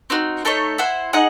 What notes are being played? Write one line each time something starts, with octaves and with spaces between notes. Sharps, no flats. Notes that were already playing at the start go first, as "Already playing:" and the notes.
C4 D#4 F#4
A3 D#4 A4 C#5
E4 C5 F#5
D#4 G#4 D#5 F#5